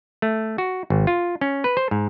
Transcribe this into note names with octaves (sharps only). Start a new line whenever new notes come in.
A3
F#4
G#1
F4
C#4
B4
C5
G#2